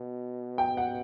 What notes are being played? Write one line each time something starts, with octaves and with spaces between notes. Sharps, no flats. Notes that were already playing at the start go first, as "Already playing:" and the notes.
Already playing: B2
G5
F#5